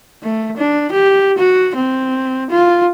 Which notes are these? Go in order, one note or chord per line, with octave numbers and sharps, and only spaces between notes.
A3
D4
G4
F#4
C4
F4